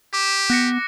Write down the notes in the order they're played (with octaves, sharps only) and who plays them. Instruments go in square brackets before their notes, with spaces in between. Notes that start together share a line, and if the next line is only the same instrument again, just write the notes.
[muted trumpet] G4 [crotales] D6
[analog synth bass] B3 [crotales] F#6 A#6 C#7